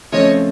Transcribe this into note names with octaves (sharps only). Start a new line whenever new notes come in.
C#3 F3 A3 C4 F4 C#5 D#5